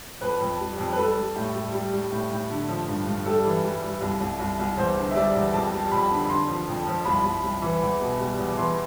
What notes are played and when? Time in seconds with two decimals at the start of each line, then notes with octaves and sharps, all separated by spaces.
0.21 F2 B4
0.41 F2
0.59 G3
0.78 F2
0.93 B4
0.97 G3 A4
1.16 G3
1.35 A2
1.54 G3
1.73 G3
1.93 G3
2.12 A2
2.30 A2
2.50 D3
2.69 F3
2.87 G2
3.06 G2
3.25 G3 A4
3.45 E3
3.64 G3
3.82 G3
4.01 C2
4.20 C2
4.39 C2
4.59 C2
4.77 E2 C5
4.97 D3
5.11 E5
5.15 G3 D5
5.35 E2
5.53 F2 A5
5.72 G3
5.91 F2 B5
6.11 D3
6.29 D3 C6
6.48 F3
6.68 F2
6.87 F3
7.05 C2 B5
7.24 C2
7.44 C2
7.62 E3
7.81 E2
8.01 B2
8.19 G3
8.38 E2
8.57 E3 C6